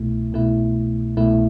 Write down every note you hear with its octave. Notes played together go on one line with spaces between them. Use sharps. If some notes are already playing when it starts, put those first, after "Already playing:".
Already playing: C2 B2 A3 E4
C2 B2 A3 E4
C2 B2 A3 E4